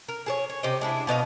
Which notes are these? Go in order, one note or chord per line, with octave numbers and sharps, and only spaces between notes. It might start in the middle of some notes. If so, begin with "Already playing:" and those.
A#4
G#4 A4 C#5
C#5
C3 G4 C5 D#5
G#3 D4 E4
B2 B3 D#5 F5